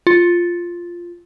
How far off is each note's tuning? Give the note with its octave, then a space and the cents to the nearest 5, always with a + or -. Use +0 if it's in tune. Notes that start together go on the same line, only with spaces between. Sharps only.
F4 -5